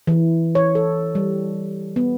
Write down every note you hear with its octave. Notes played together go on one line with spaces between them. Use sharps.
E3
C#5
A4
G3
B3